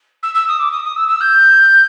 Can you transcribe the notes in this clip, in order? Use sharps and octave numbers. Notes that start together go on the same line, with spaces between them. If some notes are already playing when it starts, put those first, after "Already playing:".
E6
E6
D#6
D6
D#6
D#6
E6
E6
G6